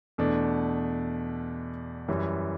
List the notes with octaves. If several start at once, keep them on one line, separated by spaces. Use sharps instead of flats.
E2 B2 A3 D4
F#2 E3 G3